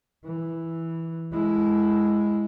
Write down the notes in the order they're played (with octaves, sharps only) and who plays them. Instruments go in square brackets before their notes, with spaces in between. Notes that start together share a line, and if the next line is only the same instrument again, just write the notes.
[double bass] E3
G#3 E4